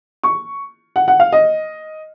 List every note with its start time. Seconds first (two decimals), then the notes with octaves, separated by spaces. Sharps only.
0.23 C#6
0.96 F#5
1.08 F#5
1.20 F5
1.32 D#5